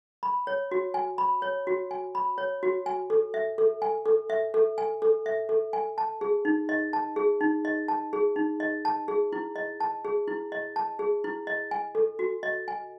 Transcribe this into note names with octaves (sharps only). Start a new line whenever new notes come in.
B5
C#5
F#4
G#5
B5
C#5
F#4
G#5
B5
C#5
F#4
G#5
A4
E5
A4
G#5
A4
E5
A4
G#5
A4
E5
A4
G#5
A5
G#4
D#4
D#5
A5
G#4
D#4
D#5
A5
G#4
D#4
D#5
A5
G#4
E4
D#5
A5
G#4
E4
D#5
A5
G#4
E4
D#5
G#5
A4
F#4
D#5
G#5